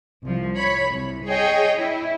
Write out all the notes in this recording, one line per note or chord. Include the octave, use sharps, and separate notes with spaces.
C2 F3
C#5 B5
C2
G#4 C#5 D#5 G5
E4